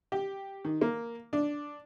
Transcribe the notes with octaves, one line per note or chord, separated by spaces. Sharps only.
G4
D#3
A#3
D4